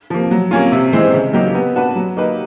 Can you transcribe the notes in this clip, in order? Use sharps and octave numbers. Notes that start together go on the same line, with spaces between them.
F3 A#3
F#3
A#3 C#4 F4
C3
E3 G#3 C4
C#3
F#3 A#3 D#4 G4
B3
D4 F#4 B4
F#3
A#3 D#4 G4 B4